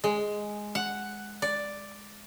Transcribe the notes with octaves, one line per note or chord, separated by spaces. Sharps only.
G#3
F#5
D5